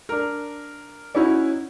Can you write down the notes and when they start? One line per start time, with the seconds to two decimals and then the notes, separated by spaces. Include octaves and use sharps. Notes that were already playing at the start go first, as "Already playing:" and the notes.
0.09 D4 A#4
1.15 C#4 D#4 E4 F#4